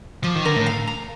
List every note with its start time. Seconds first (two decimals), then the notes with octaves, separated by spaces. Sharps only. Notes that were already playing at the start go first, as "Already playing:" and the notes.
0.24 F3 D6
0.35 D#3
0.45 D3 A#4
0.56 A2
0.67 F5
0.87 A#5